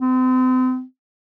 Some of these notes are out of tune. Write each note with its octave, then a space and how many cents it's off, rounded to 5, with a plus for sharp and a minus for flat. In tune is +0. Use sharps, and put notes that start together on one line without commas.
C4 -40